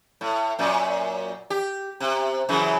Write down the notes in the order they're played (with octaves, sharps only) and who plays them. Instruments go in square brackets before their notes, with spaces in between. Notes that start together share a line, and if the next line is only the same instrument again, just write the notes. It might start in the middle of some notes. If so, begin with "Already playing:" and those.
[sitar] A2
F#2 A#2
G4
C3
F#2 C#3 E3